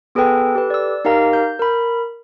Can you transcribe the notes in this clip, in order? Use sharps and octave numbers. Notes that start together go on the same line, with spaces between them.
B3 G#4 A4 B4 G5
G4 A4 B4
D5 E6
D#4 G4 A#4 F5 A#5
G6
A#4 B5